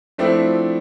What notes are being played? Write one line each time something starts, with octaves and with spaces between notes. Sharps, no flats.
F3 A3 C4 D4 E4